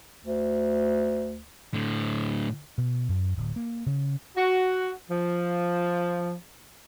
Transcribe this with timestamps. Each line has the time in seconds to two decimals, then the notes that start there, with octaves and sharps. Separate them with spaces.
0.25 D2
1.74 A2 D3
2.78 B2
3.09 F#2
3.37 D1
3.56 A#3
3.86 C#3
4.36 F#4
5.09 F3